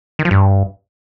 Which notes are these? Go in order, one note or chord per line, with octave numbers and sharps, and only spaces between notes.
D#3
F3
G2